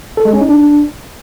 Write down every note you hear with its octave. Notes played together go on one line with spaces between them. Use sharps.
A4
G#3
C#4
D#4
D4